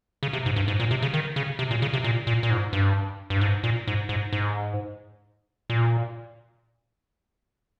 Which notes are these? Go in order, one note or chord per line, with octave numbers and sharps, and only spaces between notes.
C#3
C3
G#2
G2
G#2
A#2
C3
C#3
D#3
C#3
C3
A#2
C#3
C3
A#2
A#2
A#2
G#2
G2
G2
G#2
A#2
G#2
G#2
G#2
A#2